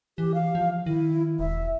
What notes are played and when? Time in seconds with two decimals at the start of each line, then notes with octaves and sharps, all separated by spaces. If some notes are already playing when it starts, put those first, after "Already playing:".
0.18 E3 G4
0.34 F5
0.55 F3
0.86 D#3 E4
1.39 E1 E5